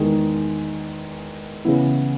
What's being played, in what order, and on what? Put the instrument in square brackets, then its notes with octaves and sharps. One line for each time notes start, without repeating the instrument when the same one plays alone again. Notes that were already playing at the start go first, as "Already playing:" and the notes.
Already playing: [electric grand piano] E2 D#3 G#3 D#4
C#3 E3 B3 E4